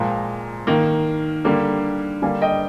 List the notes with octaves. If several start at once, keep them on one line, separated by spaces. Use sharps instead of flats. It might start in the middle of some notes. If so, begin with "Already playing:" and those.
Already playing: A#2 F3 G#3 G5 A#5
D#3 A#3
D3 G3 A#3
D3 G3 A#3 F5 G#5
D#5 G5